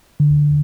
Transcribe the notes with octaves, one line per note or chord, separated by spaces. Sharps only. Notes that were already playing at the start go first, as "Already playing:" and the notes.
D3